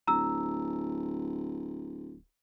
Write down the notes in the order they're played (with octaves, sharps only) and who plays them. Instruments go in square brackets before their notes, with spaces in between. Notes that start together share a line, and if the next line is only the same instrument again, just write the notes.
[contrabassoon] D1 [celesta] A#5 E6